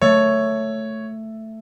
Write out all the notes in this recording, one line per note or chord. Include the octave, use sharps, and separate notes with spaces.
A3 C#5